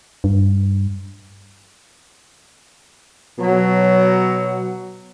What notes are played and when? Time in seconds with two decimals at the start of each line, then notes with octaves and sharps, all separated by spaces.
0.24 G2
3.39 B2 F#3